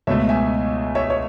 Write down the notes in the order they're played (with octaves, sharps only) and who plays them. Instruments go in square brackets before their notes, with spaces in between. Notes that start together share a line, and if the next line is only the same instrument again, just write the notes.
[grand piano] C#2 B2 A3 C#5 E5
E5 G#5
C#5 E5
C#5